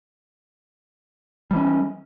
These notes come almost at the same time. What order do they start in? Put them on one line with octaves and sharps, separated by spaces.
G3 E3 C#4